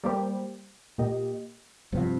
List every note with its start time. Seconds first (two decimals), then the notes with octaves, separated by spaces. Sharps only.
0.04 G3 A#3 G4 C5
0.98 A#2 A#3 G4 D#5
1.92 G2 C3 F3 C4 F4